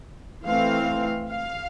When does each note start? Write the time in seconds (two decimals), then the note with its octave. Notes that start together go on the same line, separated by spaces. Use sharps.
0.45 E3 A3 C4 F5
1.29 F5